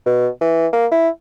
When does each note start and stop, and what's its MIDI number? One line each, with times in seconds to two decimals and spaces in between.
0.06 0.28 47
0.41 0.67 52
0.73 0.86 58
0.91 1.09 64